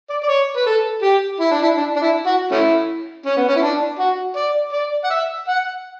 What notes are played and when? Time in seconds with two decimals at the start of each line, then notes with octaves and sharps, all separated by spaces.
0.10 D5
0.23 D5
0.28 C#5
0.56 B4
0.66 A4
1.02 G4
1.40 E4
1.51 D4
1.63 E4
1.77 D4
1.96 D4
2.02 E4
2.26 F#4
2.51 A3 C#4 E4
3.26 C#4
3.37 B3
3.49 C#4
3.56 E4
3.62 D4
3.99 F#4
4.36 D5
4.73 D5
5.04 F#5
5.10 E5
5.48 F#5